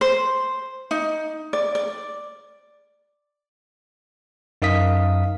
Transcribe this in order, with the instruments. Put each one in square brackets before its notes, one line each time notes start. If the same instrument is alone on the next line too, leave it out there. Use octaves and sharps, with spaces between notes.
[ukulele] C5
D#4
D5
D5
[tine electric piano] F#2 D#4 A#4 F5 D#6 B6